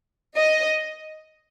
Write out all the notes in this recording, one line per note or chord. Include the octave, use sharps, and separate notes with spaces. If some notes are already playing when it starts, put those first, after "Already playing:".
D#5